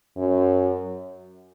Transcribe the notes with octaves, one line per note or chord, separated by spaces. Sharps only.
F#2